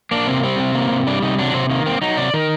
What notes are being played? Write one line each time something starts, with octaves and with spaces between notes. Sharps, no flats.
A#3 D4
C3 C4
G3 C4
C3
A#3
C3
G3 D4
C3 D#4
F#3 D4
C3 C4
D#3 A#3
A#3 C4
F#3 D#4
C3 D5
D#3 A#4